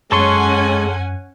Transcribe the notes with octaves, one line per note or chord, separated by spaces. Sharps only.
F#2 G#3 C#4 A4 C#5 F#5 G#5 C6